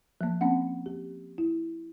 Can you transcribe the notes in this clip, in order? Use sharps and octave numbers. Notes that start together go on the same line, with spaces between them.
F3 A#3
A#3 C4 C#4 F#5
G4
E4